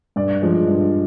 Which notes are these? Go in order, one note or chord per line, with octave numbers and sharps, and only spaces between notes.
G2 D5
F3 G#3
G2